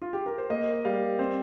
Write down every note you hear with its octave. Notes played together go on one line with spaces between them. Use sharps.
F4
G4
A#4
C5
A#3 D#5
G3 F5
C4 C5